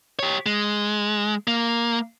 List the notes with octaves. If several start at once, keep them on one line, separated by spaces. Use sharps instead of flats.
G4 C#5
G#3
A#3